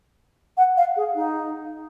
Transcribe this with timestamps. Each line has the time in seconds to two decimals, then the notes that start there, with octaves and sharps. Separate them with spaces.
0.57 F#5
0.77 F5
0.97 G#4
1.15 D#4